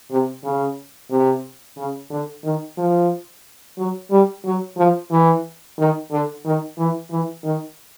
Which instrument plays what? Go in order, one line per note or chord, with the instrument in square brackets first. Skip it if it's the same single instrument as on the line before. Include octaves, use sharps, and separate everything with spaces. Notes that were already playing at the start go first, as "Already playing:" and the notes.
[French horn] C3
C#3
C3
C#3
D3
D#3
F3
F#3
G3
F#3
F3
E3
D#3
D3
D#3
E3
E3
D#3